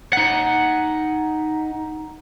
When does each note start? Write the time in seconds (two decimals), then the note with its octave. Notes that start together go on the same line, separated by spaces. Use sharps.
0.13 D#4 F#5